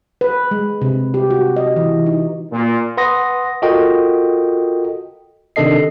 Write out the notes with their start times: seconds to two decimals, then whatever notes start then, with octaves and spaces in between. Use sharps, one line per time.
0.21 B4
0.51 G#3
0.82 C3
1.14 G4
1.31 F#4
1.56 D#5
1.76 E3
2.06 D#4
2.51 A#2
2.97 B4 F#5 C6 D#6 A#6
3.62 F4 F#4 A4 A#4 D#5 G5
5.56 C3 D#3 D4 A4 D#5 C7